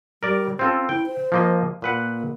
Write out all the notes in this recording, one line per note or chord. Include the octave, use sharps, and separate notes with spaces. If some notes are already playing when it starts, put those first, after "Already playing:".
G3 A#4 D5
C4 C#4 F4 A4
E4 G5
C5
F3 A#3 D#5
A#2 A#3 B4 F#5